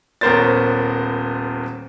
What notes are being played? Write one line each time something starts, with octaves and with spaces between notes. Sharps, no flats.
D#1 B3 A#4 C5 C#5 A6